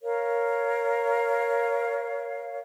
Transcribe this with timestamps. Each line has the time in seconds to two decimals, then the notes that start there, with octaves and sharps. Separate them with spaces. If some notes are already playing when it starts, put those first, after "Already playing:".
0.03 A#4 C#5 F5